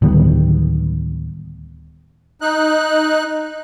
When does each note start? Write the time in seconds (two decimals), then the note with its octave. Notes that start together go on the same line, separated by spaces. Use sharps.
0.02 D1 D#3 G3 B3
2.41 D#4 F#6